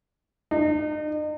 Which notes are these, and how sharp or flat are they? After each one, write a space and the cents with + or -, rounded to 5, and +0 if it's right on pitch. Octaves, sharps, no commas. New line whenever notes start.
D#4 -40